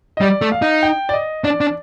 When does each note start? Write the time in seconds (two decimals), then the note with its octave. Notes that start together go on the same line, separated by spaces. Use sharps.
0.17 D#5
0.21 G3 D5
0.42 A3
0.52 F5
0.62 D#4
0.83 G5
1.09 D5
1.13 D#5
1.44 D4 D5
1.61 D4